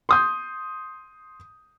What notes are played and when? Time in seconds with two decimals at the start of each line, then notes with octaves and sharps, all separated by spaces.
0.09 C6 D#6 G6